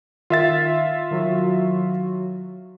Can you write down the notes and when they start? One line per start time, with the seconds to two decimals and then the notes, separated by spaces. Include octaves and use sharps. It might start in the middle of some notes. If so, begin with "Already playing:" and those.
0.30 D#3 F4 E5 A6
1.11 D#3 F#3 F#4